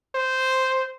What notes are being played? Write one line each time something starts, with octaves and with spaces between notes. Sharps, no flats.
C5